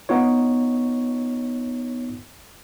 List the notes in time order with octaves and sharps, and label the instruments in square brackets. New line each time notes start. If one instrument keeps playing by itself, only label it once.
[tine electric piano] B3 D#4 F4 C#5